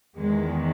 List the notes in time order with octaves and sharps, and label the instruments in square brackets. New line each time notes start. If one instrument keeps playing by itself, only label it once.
[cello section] E2 D#3 G#3